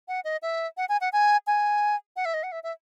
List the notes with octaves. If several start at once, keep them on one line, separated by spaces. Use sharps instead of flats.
F#5
D#5
E5
F#5
G#5
F#5
G#5
G#5
F#5
E5
D#5
F#5
E5
E5